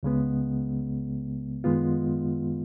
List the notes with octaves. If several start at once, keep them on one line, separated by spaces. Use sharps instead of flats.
C#2 C#3 G#3 B3
F#2 D#3 G#3 B3 F4